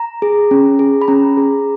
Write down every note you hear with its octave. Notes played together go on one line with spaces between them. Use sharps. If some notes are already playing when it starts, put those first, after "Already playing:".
Already playing: A#5
G#4
C#4
G#4
B5
C#4 A#5
G#4